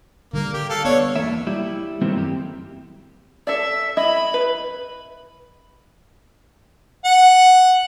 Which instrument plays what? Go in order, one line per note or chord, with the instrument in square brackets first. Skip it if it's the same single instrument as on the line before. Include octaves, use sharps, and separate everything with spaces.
[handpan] D3 G3 [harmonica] A#3
[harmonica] G4
A4 F5
[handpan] B3 [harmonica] D4 C#5
[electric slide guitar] E2 A#3 E5
G3 E4
D#3 F#3 G3 A3 A#3 C4
F#2 G4
[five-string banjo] A4 D5 [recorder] E5
[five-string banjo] E4 D#5 E5 [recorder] B5
[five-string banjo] B4
[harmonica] F#5